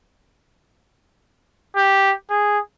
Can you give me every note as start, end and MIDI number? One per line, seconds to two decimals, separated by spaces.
1.76 2.12 67
2.30 2.58 68